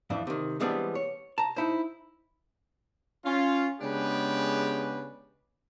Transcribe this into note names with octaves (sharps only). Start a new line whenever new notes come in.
F2 A2 E3 D4
C3 D#3
E3 G3 G#3 B3 C4 D4
C#5
A5 A#5
D#4 E4 C5
C#4 F4
C#3 G#3 B3 D4 G4 B4